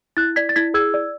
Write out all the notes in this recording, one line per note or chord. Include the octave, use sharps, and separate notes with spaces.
E4 F#6 A6
D5 G#6 B6
A6
E4 G#6 B6
G#4 E6 G#6
D5